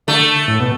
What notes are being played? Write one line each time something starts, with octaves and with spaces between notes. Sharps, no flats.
D3 A3
A2
B2